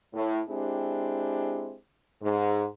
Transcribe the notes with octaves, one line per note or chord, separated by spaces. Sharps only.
A2
G#3 C4 D4 E4 G4
G#2